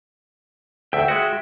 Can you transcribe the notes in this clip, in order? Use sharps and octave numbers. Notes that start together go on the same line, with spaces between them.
D2 E5 G5
G#3 F#4